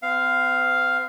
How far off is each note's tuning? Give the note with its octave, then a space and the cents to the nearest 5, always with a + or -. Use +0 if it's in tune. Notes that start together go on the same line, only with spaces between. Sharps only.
C4 -45 F5 +0